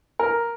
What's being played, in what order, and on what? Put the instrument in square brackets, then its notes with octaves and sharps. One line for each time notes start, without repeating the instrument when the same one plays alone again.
[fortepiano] A#4